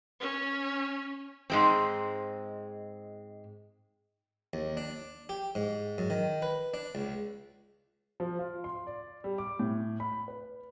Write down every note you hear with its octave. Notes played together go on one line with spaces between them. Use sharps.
C#4
G#2 G#3 C4
D#2
D4
G4
G#2
F#2
D#3
B4
D4
C#2
F3
F4
C6
D5
G3
D6
A2
B5
B4